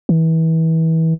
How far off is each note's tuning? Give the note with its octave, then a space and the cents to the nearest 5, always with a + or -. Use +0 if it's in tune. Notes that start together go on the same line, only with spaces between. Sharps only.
E3 -30